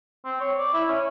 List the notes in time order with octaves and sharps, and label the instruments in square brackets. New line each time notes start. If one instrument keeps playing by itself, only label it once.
[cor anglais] C4
C#5
D5
E4
C#4